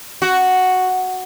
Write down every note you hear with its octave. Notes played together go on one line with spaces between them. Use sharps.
F#4